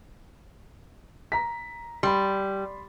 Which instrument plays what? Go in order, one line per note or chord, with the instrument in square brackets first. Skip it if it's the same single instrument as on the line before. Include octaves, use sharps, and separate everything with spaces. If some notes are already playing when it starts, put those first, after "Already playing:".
[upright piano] A#5 B6
[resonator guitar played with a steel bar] G3 [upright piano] B5 C6